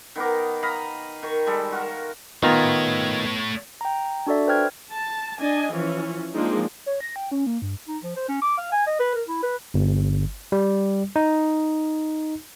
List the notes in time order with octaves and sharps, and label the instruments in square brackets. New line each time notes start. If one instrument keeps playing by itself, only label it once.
[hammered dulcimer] D#3 B3 A#4 D6
D#5 F5 A#5 B5
D#3 C#6
G3 G#3 A4
F#4 A#4 F5
[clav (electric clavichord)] D#3 F4 A#5 [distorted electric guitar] A3 C#5 [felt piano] B3
[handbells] G5 A#5
D4 F#4 A4 D5 E5
B4 C5 G5 F6 G#6
[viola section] A5
D4 D#5 G#5
E3 F3 C#4
F3 G#3 A#3 C4 D4 D#4
[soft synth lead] C#5
A#6
G5
C#4
A#3
G2
[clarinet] D#4
F3
C5
C#4
D6
F5
G#5
D#5
B4
A#4
E4
B4
[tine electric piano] G1
G3
D#4